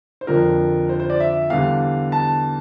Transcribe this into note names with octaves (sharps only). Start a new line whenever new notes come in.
C5
F2 D3 F3 A#4
C5
C5
D5
E5
E2 D3 G3 F5
A5